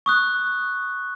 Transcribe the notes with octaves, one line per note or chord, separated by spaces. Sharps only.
C#6 D#6 F#6